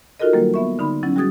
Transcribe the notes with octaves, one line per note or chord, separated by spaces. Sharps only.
D#4 F4 F#4 A4 A#4 D#5
D#3 F#3 G3 A#3 A#4
B3 E5 C#6
D3 D#4 B5 C6
F#3 C#4 E4
G3 F#4 G#4 D#6 G#6 A6